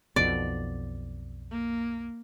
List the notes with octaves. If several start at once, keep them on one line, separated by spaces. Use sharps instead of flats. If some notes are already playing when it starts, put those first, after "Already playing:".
B1 F2 B2 D5
A#3